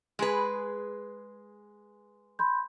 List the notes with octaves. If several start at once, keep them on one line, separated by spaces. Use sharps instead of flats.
G#3 G#4 B4
B5 C6 G6